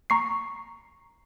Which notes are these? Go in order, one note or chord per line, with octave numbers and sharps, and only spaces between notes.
A#5 C#6 C7